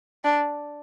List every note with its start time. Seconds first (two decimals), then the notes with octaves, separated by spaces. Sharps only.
0.24 D4